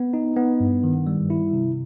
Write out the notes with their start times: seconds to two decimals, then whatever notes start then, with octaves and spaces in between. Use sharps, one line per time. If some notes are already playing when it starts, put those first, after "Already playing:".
Already playing: B3
0.13 D#4
0.37 B3
0.60 G2
0.84 D#3
1.07 G3
1.30 E4
1.53 C3